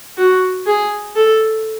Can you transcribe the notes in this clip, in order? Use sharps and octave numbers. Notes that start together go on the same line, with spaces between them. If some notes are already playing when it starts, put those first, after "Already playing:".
F#4
G#4
A4